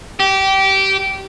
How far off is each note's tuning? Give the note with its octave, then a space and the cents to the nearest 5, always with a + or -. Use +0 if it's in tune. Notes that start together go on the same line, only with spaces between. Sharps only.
G4 -20